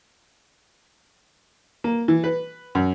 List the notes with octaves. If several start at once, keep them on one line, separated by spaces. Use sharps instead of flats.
A#3
E3
B4
F#2